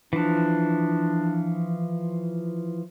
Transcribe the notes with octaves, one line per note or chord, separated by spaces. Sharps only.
E3 F3 D4